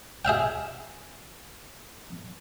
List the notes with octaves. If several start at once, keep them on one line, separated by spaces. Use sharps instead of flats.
G#4 E5 F5 G5